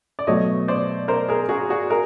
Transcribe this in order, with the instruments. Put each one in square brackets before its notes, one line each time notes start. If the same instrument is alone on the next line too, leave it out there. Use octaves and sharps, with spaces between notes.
[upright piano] D5
[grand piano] B2 F#3 A3 [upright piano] C#5 D#5
[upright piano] C5 D5
A#4 C5
G#4 A#4
F#4 G#4
F#4 G#4
G#4 A#4